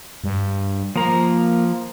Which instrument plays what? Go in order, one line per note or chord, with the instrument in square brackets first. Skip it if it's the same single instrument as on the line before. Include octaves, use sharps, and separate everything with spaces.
[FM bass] G2
[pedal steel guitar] F3 A#5 [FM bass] A#3